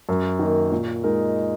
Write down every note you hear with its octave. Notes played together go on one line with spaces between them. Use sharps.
F#2
D#3 A#3
A#2
G#3 D#4 A#4